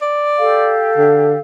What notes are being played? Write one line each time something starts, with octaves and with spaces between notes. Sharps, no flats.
D5
G4 A4 F5
D3